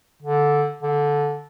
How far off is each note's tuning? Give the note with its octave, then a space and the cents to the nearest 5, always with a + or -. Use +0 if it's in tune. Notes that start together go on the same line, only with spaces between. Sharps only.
D3 -10
D3 -15